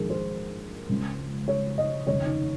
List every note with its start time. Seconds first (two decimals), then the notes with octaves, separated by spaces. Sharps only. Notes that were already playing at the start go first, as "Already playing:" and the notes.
Already playing: A#1 G#2 D#3 G#4 A#4
0.10 C5
0.89 C#2 C#3
1.48 C#5
1.78 D#5
2.07 F1 D#2 C#3 C#5
2.26 D#4